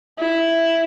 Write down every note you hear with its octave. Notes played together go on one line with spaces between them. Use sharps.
E4